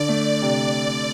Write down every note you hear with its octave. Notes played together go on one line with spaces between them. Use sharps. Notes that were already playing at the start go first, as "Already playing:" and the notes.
Already playing: D3 D4 D5
A3
C3